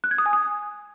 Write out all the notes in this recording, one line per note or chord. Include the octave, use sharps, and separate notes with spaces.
F#6
G#6
D#6
G#5
D#6